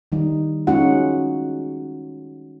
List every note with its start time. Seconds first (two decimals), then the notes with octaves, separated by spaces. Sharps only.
0.12 D#3 G3 D#4
0.67 G#3 C#4 D#4 F4 F#4 F#5